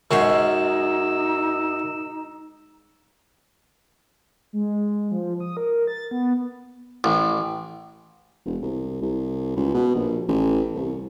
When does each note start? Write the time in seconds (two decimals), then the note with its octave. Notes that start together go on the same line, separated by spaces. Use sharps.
0.11 F#2 G#3 C#4 D#4 F#4 C5 E5 E6
4.53 G#3
5.12 F3
5.40 D#6
5.57 A#4
5.87 A6
6.11 B3
7.04 A1
8.46 E1
8.62 C2
9.02 C2
9.56 C#2
9.74 B2
9.95 A#1
10.28 A1
10.75 C2